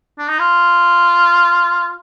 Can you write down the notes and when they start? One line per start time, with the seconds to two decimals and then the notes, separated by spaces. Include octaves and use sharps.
0.18 D4
0.29 D#4
0.39 F4